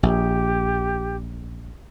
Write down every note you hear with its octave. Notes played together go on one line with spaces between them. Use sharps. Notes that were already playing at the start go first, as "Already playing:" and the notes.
A#1 G4